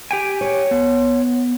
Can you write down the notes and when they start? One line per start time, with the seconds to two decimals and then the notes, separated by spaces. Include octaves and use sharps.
0.11 G4 G5 G#5
0.41 C#5
0.71 B3